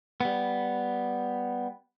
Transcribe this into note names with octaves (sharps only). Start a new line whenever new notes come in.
G3 B3